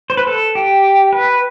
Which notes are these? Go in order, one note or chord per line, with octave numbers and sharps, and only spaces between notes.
C5
B4
A4
G4
B4